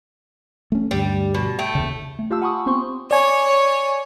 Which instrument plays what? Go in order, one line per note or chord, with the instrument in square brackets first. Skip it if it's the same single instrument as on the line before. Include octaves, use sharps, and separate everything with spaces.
[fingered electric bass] A3 C#4
[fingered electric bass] D2 G2 [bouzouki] G3
[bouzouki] B2
A3 G5
[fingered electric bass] D#2 C#3
[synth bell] A3
F4 G4 F5 A5 E6
F#5 G#5 B5 C#6 D#6
B3 C4 C5 C6 C#6
[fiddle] C#5 [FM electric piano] D5 G#5